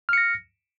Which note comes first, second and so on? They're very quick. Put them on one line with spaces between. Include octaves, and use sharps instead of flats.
F6 C#7 A#6